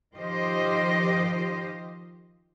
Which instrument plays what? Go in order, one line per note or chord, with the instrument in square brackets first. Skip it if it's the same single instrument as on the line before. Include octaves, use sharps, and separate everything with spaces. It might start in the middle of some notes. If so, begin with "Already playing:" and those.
[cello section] D#3 F3 G4 C5 D#5